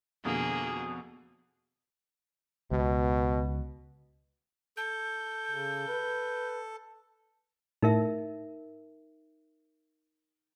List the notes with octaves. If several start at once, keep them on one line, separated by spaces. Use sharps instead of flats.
F2 B2 D3 A#3 G#4
C#2 B2
A4 G6
C#3
B4
A2 D#4 A#4 E5